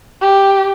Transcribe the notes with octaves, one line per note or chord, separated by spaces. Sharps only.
G4